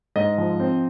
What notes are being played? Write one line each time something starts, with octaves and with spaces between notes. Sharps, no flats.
G#2 D#5
F3
C4